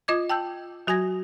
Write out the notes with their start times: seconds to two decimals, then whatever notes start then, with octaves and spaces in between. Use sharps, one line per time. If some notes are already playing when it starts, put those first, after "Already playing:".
0.08 F4 D#5 D6 G#6
0.30 G5 A5 E6 G6
0.87 F#3 F#4 G#5 G#6 A#6